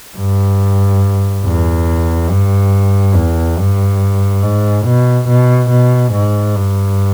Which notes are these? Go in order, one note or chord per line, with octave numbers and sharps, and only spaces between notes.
G2
E2
G2
E2
G2
G#2
B2
B2
B2
G#2
G2